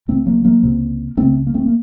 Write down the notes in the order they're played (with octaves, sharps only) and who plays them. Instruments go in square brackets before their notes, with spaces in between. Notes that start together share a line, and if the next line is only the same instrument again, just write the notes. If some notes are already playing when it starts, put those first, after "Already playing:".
[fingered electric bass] C#2 C3 A3 C4
F#3 A#3
F#3 A#3
C#2 C3
C#2 C#3 A3 C4
A#3
A3 C4
A#3